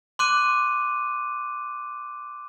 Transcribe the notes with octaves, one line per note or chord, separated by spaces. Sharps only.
C6 D6 F#6 D#7